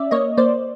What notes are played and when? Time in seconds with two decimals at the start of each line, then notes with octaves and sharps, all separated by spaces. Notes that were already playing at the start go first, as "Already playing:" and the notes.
Already playing: C#4 D5 E5
0.11 A#3 C#5 D#5
0.37 A#3 C5 D5